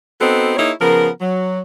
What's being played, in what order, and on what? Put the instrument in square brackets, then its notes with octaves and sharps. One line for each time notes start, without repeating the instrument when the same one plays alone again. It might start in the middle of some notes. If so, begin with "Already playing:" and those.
[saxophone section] B3 C4 D#4 F#4 A4
A#3 D#4 E4 G#4 C#5
C#3 F3 B3 A#4
F#3